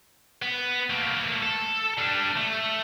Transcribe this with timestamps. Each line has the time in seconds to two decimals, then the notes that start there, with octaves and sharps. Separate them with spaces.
0.42 B3
0.90 A3 A#3
1.42 A4
1.99 G3 D4
2.37 A3